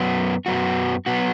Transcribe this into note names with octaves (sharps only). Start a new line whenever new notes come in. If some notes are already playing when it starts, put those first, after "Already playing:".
Already playing: F#2 F#3 B3 F#4
F#2 F#3 B3 F#4
F#3 B3 F#4